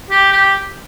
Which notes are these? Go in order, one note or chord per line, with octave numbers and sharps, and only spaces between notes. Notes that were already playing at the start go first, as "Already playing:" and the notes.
G4
G4